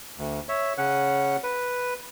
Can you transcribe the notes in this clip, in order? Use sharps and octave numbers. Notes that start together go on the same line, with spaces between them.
D2
C#5 E5
C#3 C#4 F#5 F#6
B4